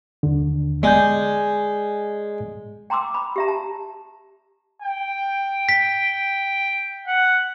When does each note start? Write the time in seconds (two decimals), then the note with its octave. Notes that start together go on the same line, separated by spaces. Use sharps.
0.23 D#2 D3
0.83 G#3 D5 G#5 G6
2.90 G5 A#5 C6 D6 E6
3.14 B5
3.36 G4 E5 A#5
3.48 A5
4.82 G5
5.69 B6
7.07 F#5